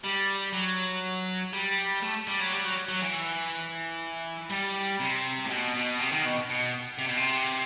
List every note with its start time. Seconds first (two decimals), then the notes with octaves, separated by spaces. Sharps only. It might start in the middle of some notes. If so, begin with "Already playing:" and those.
0.04 G3
0.53 F#3
1.53 G3
2.03 A3
2.27 G3
2.40 F#3
2.52 G3
2.64 F#3
2.89 F#3
3.02 E3
4.51 G3
5.00 C3
5.45 A2
5.50 B2
5.75 B2
5.99 C3
6.11 D#3
6.25 B2
6.50 B2
6.98 C3
7.07 B2
7.17 C3